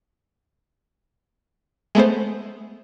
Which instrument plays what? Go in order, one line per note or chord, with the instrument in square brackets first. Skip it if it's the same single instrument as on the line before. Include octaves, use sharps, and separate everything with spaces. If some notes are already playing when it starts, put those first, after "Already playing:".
[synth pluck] G#3 A3 B3 C5